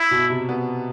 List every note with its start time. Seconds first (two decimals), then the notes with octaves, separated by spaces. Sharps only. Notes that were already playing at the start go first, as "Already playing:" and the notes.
Already playing: E4
0.11 B2
0.30 C3
0.49 B3